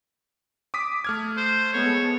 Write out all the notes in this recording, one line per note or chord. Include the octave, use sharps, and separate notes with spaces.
D6 D#6 B6
A3 F6 G#6
C5
G#3 B3 A4 C#5